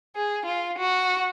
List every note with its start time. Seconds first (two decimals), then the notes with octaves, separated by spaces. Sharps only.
0.16 G#4
0.46 F4
0.78 F#4